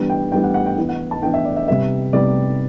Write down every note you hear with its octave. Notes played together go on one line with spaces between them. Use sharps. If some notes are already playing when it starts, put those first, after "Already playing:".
Already playing: E3 G3 B3 D4
G5
E3 G3 B3 D4 G5
F#5
F#5
G5
E3 B3 D4
F#5
A5
E3 B3 D4 G5
E5
D5
E5
C3 G3 B3 E5
C3 G3 B3 D5